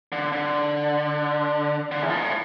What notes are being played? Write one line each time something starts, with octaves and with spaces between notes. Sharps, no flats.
D3
D3
D3
E2
F2
G#2
A2